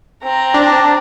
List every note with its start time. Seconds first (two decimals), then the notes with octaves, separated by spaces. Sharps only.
0.23 C4 A#5
0.54 D4